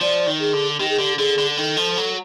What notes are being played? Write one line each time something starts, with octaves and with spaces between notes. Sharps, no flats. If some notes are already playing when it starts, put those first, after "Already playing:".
F3 D5
D#3
G#4
D3
D#3 G4
G#4
D3 G4
D3 G#4
D3
D#3 A4
F3
F#3